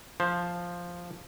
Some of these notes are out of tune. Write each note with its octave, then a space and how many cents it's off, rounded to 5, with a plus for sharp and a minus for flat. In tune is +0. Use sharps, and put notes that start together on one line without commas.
F3 +0 C5 +10